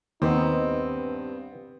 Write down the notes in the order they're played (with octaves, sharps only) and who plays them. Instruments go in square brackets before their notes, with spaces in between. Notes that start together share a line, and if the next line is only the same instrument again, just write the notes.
[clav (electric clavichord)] D#2 [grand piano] B3 C4 [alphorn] D#4
[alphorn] G2